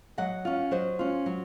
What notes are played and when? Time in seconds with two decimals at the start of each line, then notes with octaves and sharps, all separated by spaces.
0.18 F#3 D#5 F#5
0.45 C#4 F4
0.71 F#3 C5 D#5
0.99 C#4 F4
1.26 F#3